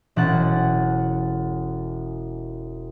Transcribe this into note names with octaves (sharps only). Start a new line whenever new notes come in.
E1 C#4 F#5 A6